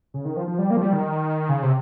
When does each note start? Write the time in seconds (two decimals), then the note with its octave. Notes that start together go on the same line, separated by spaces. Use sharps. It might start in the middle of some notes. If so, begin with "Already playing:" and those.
0.14 C#3
0.25 D#3
0.37 F3
0.48 F3
0.59 G3
0.70 A#3
0.77 F3
0.82 G3
0.93 D#3
1.49 C#3
1.63 C3